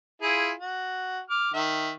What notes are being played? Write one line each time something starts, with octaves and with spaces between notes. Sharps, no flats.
E4 F4 G#4
F#4
D6 F6
D#3 E5